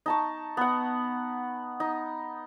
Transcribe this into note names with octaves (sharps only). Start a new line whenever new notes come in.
D#4 A5 C#6
B3 F#5
D#4